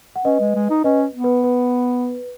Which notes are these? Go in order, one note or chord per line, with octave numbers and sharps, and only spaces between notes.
F#5
C#4 B4 D#5
G#3
G#3
D#4
C#4 B4 D#5
B3
B4
B4